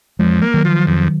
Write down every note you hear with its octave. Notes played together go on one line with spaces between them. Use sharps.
F2 F3 G#3
A#3
D#3 F#3
F3
F2